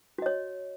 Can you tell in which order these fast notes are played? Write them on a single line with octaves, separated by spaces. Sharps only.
F#4 D#5 C#5